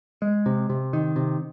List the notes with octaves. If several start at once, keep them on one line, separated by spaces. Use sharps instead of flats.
G#3
C3
C3
D#3
C3